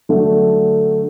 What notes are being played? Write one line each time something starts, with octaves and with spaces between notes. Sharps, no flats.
D3 F#3 A3 D4